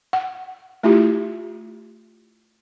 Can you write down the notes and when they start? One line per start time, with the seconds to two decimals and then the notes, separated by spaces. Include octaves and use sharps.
0.13 F#5
0.83 A3 E4 F4 G4